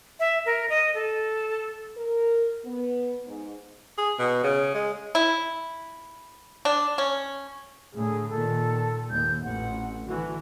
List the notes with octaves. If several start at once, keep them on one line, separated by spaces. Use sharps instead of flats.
E5
A#4
D#5
A4
A#4
B3
G#2
G#4
B2
C#3
G#3
E4
D4
C#4
A2 D3 A3 G#4
A#2 D#3 A4
D#2 G#2 G6
A1 F2 F#5
D3 E3 F#4